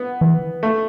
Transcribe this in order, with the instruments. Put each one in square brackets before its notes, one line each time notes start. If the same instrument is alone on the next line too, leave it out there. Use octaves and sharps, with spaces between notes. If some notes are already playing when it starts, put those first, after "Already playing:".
Already playing: [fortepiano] B3
[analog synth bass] E3
[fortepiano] A3